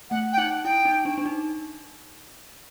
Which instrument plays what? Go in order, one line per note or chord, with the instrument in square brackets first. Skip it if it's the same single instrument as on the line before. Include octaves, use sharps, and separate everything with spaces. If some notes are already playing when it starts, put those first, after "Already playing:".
[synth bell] A3 [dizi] F#5
[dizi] G5
[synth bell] D#4 [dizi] F#5
[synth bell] E4 [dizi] G5
[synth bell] D#4
D4
D4
D#4